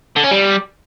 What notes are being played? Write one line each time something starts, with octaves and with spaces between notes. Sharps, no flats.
D3
C#4
G3